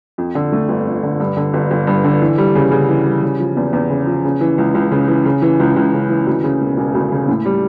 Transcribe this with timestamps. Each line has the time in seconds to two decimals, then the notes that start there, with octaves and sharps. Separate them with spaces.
0.18 F2
0.35 D3
0.52 A3
0.69 G1
0.86 F2
1.03 D3
1.20 G2
1.37 D3
1.54 G1
1.71 G1
1.87 G2
2.04 D3
2.22 E3
2.38 G3
2.55 C#3
2.71 C#3
2.89 E3
3.06 G3
3.23 C#3
3.40 F3
3.57 E2
3.73 E2
3.90 C#3
4.07 F3
4.24 C#3
4.41 E3
4.58 C#2
4.74 C#2
4.91 C#3
5.08 E3
5.25 C#3
5.42 E3
5.60 C#2
5.76 C#2
5.93 C#3
6.10 E3
6.27 D2
6.44 C#3
6.61 E1
6.77 E1
6.94 D2
7.12 C#3
7.28 A2
7.45 G3